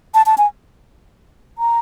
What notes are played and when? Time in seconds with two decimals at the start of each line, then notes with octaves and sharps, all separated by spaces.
0.14 A5
0.26 A5
0.38 G#5
1.58 A#5